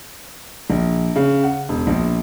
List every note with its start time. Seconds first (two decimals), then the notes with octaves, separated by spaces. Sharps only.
0.70 A#1
1.16 C#3
1.43 F#5
1.69 E1
1.87 A#1